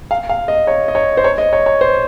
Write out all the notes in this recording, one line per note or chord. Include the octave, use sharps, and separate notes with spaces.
F5
F5
D#5
C#5
D#5
C#5
C5
C#5
D#5
C#5
C#5
C5